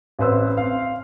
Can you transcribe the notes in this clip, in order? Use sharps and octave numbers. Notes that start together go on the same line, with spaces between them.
A1 C4 B4 C5 E6
C4 F5